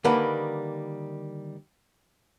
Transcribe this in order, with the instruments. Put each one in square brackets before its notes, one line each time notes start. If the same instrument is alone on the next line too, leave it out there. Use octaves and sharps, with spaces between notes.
[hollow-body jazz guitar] D3 D#3 G3 A#3 B4